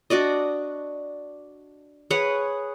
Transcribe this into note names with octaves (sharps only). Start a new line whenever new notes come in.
D4 F#4 D5 D#5
G#4 B4 C#5 F#5